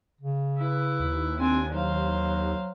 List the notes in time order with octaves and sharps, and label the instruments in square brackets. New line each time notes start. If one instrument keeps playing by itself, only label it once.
[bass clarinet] C#3
[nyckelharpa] E4 B4
[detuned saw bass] D#2
[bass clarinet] C4 [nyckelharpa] D4 G#5
[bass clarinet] F#3 [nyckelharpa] C5 F5